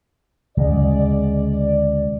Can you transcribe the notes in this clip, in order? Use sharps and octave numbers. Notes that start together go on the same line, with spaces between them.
D2 C#3 G#3 D5